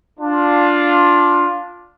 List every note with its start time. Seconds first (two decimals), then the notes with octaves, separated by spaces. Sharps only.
0.20 D4 F4